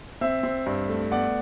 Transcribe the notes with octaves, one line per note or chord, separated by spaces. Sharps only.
C4 E5
C4
G2
A3
B3 D5 F#5